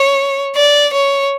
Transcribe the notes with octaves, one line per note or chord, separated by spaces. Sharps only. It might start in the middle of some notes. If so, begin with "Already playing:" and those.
Already playing: C#5
D5
C#5